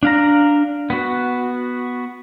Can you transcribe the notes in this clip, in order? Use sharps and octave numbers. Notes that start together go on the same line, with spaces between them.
D4 F5 A#5
B3 F#4